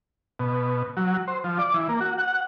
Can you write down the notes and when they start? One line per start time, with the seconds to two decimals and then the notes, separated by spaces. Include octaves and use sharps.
0.39 B2
0.97 F#3
1.28 C5
1.44 F3
1.59 D5
1.74 E3
1.89 A#3
2.01 F#4
2.18 F#5